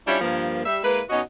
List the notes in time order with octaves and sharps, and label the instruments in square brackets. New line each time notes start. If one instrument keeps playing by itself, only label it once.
[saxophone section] G3 C#4 D4 E4 F4 C#5
G2 F3 A#3
G3 E5
G#3 A#3 E4 B4
B2 C#4 D#4 F#4 D#5